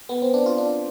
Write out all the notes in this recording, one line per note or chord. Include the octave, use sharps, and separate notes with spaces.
B3
C4
D4
F4
D4